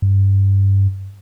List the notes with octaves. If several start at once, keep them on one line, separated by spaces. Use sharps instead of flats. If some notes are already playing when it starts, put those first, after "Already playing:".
G2